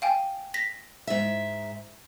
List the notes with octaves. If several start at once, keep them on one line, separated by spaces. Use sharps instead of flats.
F5 G5 G#5
A#6 B6
G#2 E5